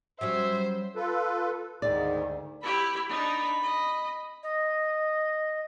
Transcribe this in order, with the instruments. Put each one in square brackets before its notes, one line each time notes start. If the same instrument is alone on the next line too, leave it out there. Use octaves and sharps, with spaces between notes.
[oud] F#3 G3 C#4 [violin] C5 [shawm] E5
[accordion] F4 A4 B4
[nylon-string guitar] D2 D5 [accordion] G#2 D#3
[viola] E4 G4 [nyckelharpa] B5
[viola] D4 D#4 [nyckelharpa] B5
[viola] D#5
[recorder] D#5